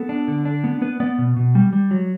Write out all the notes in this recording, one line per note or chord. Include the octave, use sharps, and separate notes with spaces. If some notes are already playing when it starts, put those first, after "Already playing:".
Already playing: B3 A4
D4
D3
D4
B3
B3 B4
B3 D5
B2
B2
G3
G3
F#3